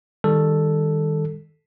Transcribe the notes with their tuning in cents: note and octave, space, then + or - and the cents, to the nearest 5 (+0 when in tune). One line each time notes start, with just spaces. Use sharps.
D#3 +0 G3 +30 A4 +0